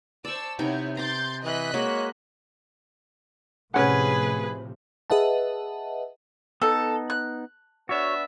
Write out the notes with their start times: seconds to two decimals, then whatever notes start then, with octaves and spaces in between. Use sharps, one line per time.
0.25 C5 D5 A5 C#6 E6
0.59 C3 B3 D#4 E4 C#5 G5
0.97 A#5 C6 D6 G6 A6
1.44 E3 D#5 F#6 B6
1.74 G#3 A#3 F#4 C#5
3.74 A2 C3 F3 C#4 G#4 B4 F#5
5.10 G#4 B4 D#5 E5 F#5 A5
6.62 B3 D#4 A4
7.10 F#6
7.89 B3 D4 F#4 C#5 E5